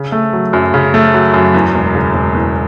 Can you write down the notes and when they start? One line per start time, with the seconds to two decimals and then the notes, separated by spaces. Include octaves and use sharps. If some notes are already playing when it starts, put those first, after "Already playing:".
Already playing: C#3
0.12 A3
0.33 F#3
0.53 F#2
0.74 C#3
0.94 A3
1.14 F#3
1.34 F#2
1.54 E2
1.74 E1
1.95 C#3
2.14 E1
2.35 E2